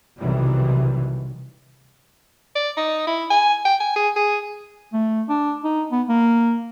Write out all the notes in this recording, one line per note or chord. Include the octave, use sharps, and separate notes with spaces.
B1 C3 D#3 E3 F#3 G3
D5
D#4
E4
G#5
G5
G#5
G#4
G#4
A3
D4
D#4
B3
A#3